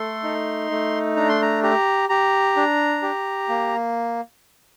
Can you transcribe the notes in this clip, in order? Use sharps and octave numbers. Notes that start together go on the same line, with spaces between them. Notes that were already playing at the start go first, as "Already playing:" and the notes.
Already playing: A3 A4 C6
D#4
A3
D4 A#5
C6
A#5
G4 A#5
G4 A#5
D4
G4
A#3